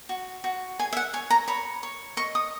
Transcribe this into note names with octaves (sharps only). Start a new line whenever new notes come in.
F#4
F#4
G#4 G#5
E5
F#5
C#5 G#5
A#5
C#5 B5
C#5
D#5 C#6
D#6